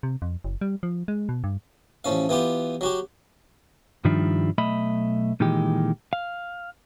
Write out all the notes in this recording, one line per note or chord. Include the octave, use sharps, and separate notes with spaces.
C3
F2
F#1
G3
F3
G#3
B2
G2
A1 F3 C#4 F5
E3 B3 F4 G4
F#3 F#4 G4
G2 D#3 F3 G3 D4 E4
B1 A3 D#5 E5 B5
A#2 D#3 E3 G#3 G4
F5